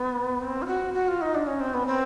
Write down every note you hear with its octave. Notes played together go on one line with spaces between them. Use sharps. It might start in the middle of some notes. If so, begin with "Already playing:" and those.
Already playing: B3
C4
F4
F#4
F#4
F4
D#4
D4
C#4
C4
B3
C4